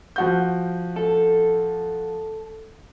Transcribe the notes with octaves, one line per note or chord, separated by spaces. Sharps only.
F3 F#4 G6
A4